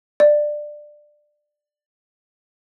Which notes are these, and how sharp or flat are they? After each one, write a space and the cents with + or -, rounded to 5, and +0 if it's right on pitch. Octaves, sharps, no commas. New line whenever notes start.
D5 +15